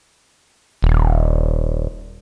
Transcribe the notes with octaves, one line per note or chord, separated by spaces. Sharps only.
D#1